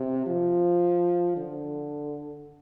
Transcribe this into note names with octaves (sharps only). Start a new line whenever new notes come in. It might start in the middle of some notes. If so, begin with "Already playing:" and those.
Already playing: C3
F3
D3